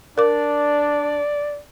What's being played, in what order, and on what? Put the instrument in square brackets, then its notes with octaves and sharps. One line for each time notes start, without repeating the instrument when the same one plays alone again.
[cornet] D4 [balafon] A#4 D6 [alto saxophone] D5